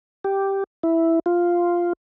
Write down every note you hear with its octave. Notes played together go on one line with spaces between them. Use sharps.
G4
E4
F4